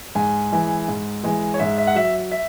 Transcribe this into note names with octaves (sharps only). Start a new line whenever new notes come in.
G#2 G#5
E3 G#3
G#2
E3 G#3
C#5
G#2 E5
E5
F#5
F#3 E5
E5